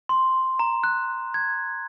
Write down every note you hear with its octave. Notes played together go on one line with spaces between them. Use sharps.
C6
A#5
F#6
G#6